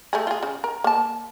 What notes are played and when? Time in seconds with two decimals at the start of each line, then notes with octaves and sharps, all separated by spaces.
0.13 A3 G4 G#4
0.27 F4 G#4
0.43 C#3
0.64 A#4
0.84 A#3 A5